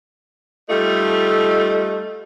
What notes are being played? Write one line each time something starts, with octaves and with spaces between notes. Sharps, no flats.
G3 A3 D#4 F4 A4